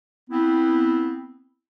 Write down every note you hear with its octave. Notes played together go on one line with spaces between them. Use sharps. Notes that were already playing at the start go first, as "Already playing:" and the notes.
B3 C4 E4